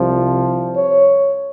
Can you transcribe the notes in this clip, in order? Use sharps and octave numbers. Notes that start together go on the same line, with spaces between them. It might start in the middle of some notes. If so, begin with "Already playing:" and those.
Already playing: C2 C3 F3
C#5